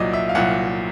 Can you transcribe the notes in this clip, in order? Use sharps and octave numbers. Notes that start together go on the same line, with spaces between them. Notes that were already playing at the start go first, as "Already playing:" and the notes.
Already playing: C2 A#2 F#3 D5 D#5
E5
F5
C2 A#2 F#3 F#5